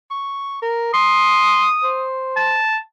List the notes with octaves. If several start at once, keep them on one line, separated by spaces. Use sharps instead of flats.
C#6
A#4
C6 D#6
C5
A5